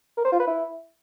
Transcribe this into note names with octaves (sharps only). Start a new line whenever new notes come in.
A#4
C5
F4
B4
E4